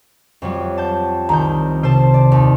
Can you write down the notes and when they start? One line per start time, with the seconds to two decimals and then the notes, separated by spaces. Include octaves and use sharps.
0.42 F2 F#3 G3
0.78 A5 G6
1.29 C2 D#3 A#5 G6
1.83 C3 C5 A5
2.14 D5
2.32 D#2